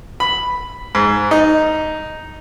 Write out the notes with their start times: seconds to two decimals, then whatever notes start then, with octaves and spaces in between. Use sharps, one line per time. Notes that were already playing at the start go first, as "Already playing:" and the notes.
0.20 B5
0.95 G#2
1.31 D#4